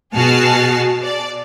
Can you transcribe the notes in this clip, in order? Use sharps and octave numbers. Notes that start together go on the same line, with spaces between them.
B2 F#4 G#4 A5 F6 C7
D5